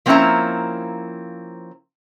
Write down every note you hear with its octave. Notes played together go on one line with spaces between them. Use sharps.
F3 A#3 C4 C#4 E4 A#5